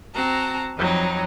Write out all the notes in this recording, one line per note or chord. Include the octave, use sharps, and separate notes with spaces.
C4 F#4 A5 A#5
F2 F#3 G3 D#4